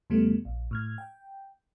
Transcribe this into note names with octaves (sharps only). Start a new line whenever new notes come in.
F2 C#3 G3 A3 B3
A#1
A2 F6 G#6
G5